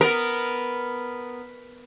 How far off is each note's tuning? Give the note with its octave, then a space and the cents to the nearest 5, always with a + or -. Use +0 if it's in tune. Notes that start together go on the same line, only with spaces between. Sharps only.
B3 +0 A#4 +0